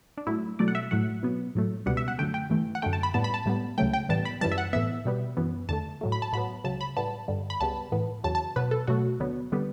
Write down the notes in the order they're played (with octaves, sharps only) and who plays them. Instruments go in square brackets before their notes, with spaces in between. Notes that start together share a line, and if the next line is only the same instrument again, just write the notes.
[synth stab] D4
A2 F#3 A3 E4
B2 F#3 A3 D5
F#5
E5
A2 F#3 A3 F#5
B2 F#3 B3
A2 F#3 A3
C#2 B2 G3 B3 F#5
E5
F#5
F#2 D3 A3 G5
G5
G2 E3 A3
F#5
F#2 D3 A3 G5
A5
B5
A2 G3 B3 A5
B5
A5
A2 G3 B3
C#2 C#3 F#3 A3 G5
G5
A2 E3 G3 B3 A5
B5
F#2 C#3 E3 G3 A5
E5
F#5
A2 E3 B3 E5
B2 G3 B3
F#2 E3 B3
E2 D3 A3 A5
A2 F#3 A3
B5
A5
A2 F#3 B3 B5
C#2 C#3 F#3 A5
B5
A2 G3 B3 A5
G2 D3 G3
B5
C#2 C#3 G3 B3 A5
A2 E3 B3
E2 C#3 F#3 A5
A5
B2 F#3 B3 B4
A4
B2 F#3 A3 F#4
D2 D3 F#3 B3
D3 G3 B3